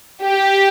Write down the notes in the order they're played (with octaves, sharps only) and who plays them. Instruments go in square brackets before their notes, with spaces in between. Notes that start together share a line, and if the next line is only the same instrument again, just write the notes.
[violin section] G4